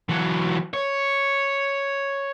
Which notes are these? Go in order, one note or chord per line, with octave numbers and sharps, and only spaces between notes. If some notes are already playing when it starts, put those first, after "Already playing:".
E3 F#3
C#5